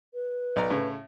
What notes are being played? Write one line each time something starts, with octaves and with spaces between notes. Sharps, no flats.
B4
B1 D5 A#5
A2 C#3